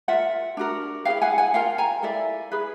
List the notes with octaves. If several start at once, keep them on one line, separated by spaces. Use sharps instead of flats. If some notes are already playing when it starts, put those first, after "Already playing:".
F4 A#4 E5 F#5
D4 F#4 A#4
E4 G#4 B4 F5 G5
F#5 G#5
F#5 G#5
F4 A#4 F5 G5
G#5 A#5
E4 A4 D5 E5
E4 G#4 B4